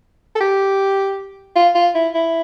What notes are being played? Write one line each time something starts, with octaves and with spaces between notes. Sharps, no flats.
A4
G4
F4
F4
E4
E4